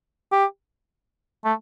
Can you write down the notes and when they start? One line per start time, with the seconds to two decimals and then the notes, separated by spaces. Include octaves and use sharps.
0.32 G4
1.45 A3